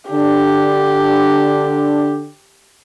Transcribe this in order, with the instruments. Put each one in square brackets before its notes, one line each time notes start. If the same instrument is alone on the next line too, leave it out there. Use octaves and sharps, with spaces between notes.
[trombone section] D3 D4 [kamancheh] G4